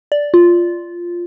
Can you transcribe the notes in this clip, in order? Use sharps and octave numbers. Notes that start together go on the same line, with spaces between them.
D5
F4